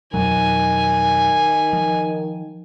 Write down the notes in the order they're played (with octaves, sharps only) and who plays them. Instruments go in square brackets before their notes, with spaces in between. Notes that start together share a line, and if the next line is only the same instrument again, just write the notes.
[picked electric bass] F2 B2 F#3 [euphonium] D#3 [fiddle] G#5
[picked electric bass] F3